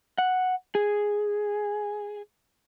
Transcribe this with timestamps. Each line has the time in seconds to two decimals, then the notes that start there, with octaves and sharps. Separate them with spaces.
0.18 F#5
0.75 G#4